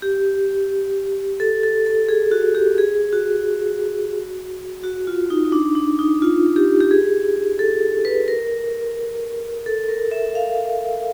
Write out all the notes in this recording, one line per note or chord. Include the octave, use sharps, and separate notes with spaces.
G4
A4
A4
A4
G#4
F#4
G4
G#4
F#4
F#4
F4
D#4
D#4
D4
D4
D#4
F4
G4
G4
G#4
A4
B4
A#4
A4
A#4
E5
F5